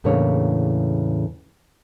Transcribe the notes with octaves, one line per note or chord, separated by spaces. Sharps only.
E2 A2 C#3 A#3 D4 C#5